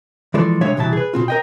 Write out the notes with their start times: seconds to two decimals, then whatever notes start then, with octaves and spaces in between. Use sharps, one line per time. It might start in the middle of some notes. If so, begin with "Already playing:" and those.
0.34 E3 F3 G#3 A4 D5
0.61 C2 G#3 D4 C#5 E5 F5
0.77 C2 B2 E3 E5 A5
0.93 G#4 B4
1.13 B2 C4 F4
1.28 A#4 D#5 G5